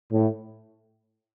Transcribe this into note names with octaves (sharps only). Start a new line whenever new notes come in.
A2